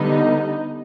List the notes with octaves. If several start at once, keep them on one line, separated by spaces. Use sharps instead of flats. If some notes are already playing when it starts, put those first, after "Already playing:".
Already playing: D3 G3 B3 D#4